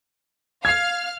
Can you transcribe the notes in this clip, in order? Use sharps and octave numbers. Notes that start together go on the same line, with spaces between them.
F5 F6 G#6 C7